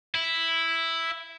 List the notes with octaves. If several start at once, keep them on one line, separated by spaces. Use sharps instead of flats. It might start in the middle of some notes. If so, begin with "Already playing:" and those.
E4